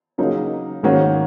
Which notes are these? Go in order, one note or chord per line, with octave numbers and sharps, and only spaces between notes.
C#3 F#3 A#3 D#4
G#2 D#3 A#3 C#4 F#4